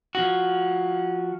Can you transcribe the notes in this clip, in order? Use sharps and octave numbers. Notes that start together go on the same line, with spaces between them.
F3 F#4